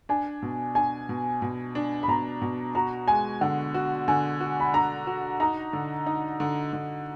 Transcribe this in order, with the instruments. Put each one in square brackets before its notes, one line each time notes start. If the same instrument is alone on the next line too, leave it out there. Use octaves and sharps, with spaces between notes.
[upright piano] D4 [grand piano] G#5
[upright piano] B2
[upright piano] D4 [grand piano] G#5
[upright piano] B2
B2
D4
[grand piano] B5
[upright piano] B2 [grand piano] A#5
[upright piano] B2
[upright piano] F#4 [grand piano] A#5
[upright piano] G#3 [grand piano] G#5
[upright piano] D3 [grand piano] F#5
[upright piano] F#4
[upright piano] D3 [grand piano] G#5
[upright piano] F#4
[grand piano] B5
[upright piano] D4 [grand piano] A#5
[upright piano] F#4
[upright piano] D#4 [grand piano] A#5
[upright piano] D3
D#4
D3
D3